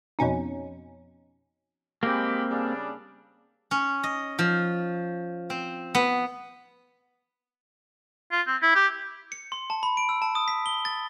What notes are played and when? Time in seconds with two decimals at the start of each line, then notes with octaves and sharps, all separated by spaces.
0.19 F2 B2 C#4 D#4
2.03 G#3 A#3 C4 G4 B5
2.50 C#3 G3 D4
3.71 C#4
4.04 D#5
4.39 F3
5.50 C4
5.95 B3
8.32 F4
8.47 C4
8.63 E4
8.75 G4
9.32 C#7
9.52 C6
9.70 A5
9.83 B5
9.97 D7
10.09 E6
10.22 A5
10.35 D#6
10.48 B6
10.66 G7
10.85 A6